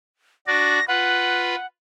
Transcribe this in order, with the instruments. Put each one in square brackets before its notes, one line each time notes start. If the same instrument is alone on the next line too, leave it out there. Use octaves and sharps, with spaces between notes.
[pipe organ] D4 F#4 D5 [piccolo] A#6
[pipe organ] F4 B4 [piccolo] F#5